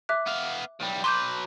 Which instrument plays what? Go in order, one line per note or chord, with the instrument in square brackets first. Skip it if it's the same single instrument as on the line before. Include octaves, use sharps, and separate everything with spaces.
[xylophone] E5 D6 F#6
[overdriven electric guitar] B3 F5
B1 G3
[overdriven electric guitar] F#3 B4 [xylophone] C6 D6 G6